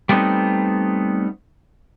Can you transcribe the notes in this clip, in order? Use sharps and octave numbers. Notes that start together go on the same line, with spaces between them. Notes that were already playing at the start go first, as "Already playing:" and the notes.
G3 A3 B3 C4 D#4